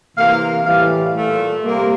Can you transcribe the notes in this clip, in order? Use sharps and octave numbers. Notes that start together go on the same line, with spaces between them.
C3 E3 A#3 F5
A2 E3 G3 F5
A#2 A3 F5
C3 G3 A#3